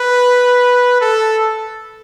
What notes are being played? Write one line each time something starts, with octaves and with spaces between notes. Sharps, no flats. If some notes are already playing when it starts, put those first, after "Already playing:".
Already playing: B4
A4